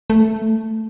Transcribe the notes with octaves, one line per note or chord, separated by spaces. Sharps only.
A3